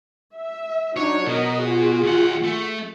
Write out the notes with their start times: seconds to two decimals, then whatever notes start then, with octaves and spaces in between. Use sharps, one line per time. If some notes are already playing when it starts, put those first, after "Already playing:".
0.36 E5
0.97 F#3 D4 D#4 C#5
1.27 B2 A#4 D#5
1.63 F4 F#4 G#4
2.03 D#2 F#5
2.44 A3